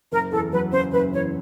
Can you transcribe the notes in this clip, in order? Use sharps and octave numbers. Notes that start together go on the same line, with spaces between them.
F#1 A#4
E2 A4
F#3 B4
C#3 C5
F#1 B4
E2 C#5